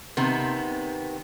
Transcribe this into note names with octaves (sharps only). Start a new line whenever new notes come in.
C3 D#3 B3